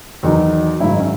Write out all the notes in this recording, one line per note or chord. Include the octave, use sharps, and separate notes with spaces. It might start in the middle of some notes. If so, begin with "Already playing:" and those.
E2 D#3 F#3 D#4
G#1 G#2 F#3 E4
D#4
C#4